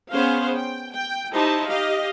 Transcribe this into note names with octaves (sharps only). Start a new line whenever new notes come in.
B3 C#4 G#4 C5 F5
G5
G5
D#4 E4 G4 C5 A5
G4 D#5 F5